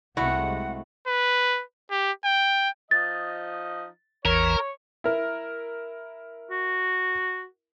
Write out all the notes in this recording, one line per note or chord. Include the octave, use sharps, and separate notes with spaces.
C2 G#3 A3 C4 E4 F#4 F#5
B4
G4
G5
F3 D#4 D#5 A6
A1 E2 E3 A#4 C#5
E4 A#4
F#4